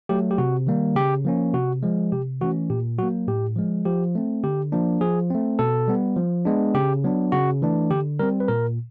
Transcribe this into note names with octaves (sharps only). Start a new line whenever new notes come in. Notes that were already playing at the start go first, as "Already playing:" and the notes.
F#3 A3 G4
G4
C3 F#4
D#3 G3 A#3
C#3 G4
F3 A#3 C#4
C3 F#4
F3 G#3
C3 G4
E3 A3 C#4 F#4
A#2 G4
F#3 A#3 F#4
A2 G4
F3 G#3
F3 G4
A3 C4
D3 G4
F3 A#3 D4
F3 G#4
A3 C4
B2 A4
G3 B3
F3
G#3 B3 D4
C#3 G4
F#3 B3 D4
C#3 F#4
E3 A3 D4
D3 G4
G3 C4 A#4
B4
A#2 A#4